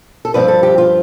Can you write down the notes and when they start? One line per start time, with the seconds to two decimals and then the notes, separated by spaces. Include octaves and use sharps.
0.25 A4
0.34 G2 F3 C4 B4
0.48 A4
0.63 G4
0.78 F4